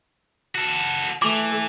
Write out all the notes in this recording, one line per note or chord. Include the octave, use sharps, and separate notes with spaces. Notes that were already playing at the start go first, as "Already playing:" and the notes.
F#4 A4
E3 A3 D6